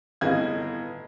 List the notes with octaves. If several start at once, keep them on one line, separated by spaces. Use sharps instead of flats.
G1 A2 B3 D#5 F5 G#6